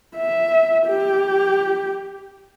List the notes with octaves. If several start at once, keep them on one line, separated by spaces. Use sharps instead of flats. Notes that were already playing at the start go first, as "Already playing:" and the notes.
E5
G4